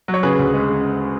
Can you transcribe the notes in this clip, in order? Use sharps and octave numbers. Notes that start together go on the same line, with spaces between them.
F#3
C#5
C#3 G#4 B4
D2
G#3
C#3